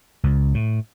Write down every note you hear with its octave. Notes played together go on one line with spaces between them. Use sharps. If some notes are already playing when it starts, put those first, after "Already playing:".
C#2
A2